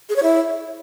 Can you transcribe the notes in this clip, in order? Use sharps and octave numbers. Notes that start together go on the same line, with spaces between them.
G#4
C#5
E4